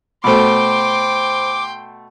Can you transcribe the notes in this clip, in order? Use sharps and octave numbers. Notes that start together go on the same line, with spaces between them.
B2 A3 C5 G5 B5 C6 D6